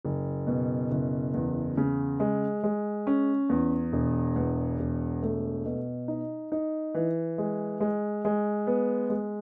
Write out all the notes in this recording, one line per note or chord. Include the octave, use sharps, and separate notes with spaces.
F#1
B2
F#1
E2
C#3
G#3
G#3
C#4
E2
E1
E2
E1
A3
B2
D#4
D#4
E3
G#3
G#3
G#3
B3
G#3